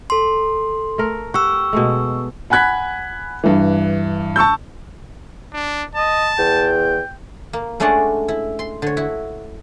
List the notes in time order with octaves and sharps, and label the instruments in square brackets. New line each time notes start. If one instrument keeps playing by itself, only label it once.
[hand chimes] A4 C6
[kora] A3 A#4
[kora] G4 F#5 [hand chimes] C#6 E6
[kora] B2 G#3 A3
[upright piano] F#5 G#5 B5 F#6 G#6 B6
G2 E3
A5 C#6 E6 G6
[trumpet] D4
[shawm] D#5 [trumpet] A5
[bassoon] E2 [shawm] G5
[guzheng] A#3
G#3 A3 C#4 D4 D5 F#5
E4
C6
D3 C#5
E4 F#4